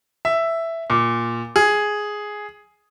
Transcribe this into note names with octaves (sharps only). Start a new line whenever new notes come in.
E5
A#2
G#4